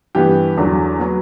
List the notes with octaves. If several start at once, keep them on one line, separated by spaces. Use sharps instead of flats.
G2 E3 B3 G4
E2 D3 F#3
F#3 B3